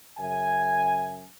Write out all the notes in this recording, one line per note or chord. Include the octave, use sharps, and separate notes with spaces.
F#2 C#3 E5 G#5